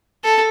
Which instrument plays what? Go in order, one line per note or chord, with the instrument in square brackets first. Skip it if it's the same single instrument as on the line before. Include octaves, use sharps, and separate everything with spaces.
[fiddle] A4